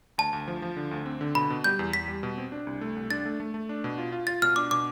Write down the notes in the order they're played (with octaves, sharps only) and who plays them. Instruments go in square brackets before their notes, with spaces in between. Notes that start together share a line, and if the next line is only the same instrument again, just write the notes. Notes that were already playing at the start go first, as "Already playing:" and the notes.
[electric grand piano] D2 [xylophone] A5
[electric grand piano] D2
F3
F3
D3
D2
C4
D3
[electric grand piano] B2 [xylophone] B5
[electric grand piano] B2
[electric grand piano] G3 [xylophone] G6
[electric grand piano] E2
[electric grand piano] E2 [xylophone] B6
[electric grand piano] G3
B2
C4
D4
C2
A3
C2
[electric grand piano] D4 [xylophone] A6
[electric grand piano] A3
A3
A3
D4
B2
F4
F4
[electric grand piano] F4 [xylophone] A6
[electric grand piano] B2 [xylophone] F6
[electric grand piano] D4 [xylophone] D6
[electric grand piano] B2 [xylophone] D6